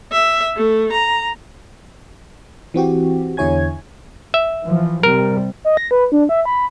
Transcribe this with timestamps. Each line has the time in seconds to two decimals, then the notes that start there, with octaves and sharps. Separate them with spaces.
0.12 E5
0.57 A3
0.93 A#5
2.74 E3 C4 F#4 G4
3.37 E2 D3 E4 C#5 G#5 G#6
4.34 E5
4.64 E3 F3
5.03 C3 G3 A#4
5.65 D#5
5.77 A#6
5.91 B4
6.12 D4
6.29 E5
6.45 B5